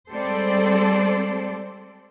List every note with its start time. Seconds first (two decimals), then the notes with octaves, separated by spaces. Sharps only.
0.11 G3 G#3 C4 A4 C5 D5